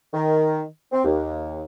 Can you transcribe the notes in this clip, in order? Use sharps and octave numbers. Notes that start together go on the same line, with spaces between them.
D#3
C4
D#2